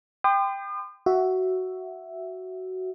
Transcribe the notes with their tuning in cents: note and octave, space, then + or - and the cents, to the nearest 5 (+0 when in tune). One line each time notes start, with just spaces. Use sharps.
G5 +10 C6 -40 D#6 -45
F#4 +10 E5 +5